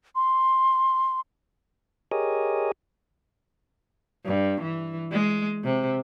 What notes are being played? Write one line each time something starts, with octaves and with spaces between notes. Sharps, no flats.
C6
G4 G#4 A#4 C#5 D#5 G#5
G2
E3
G#3
C3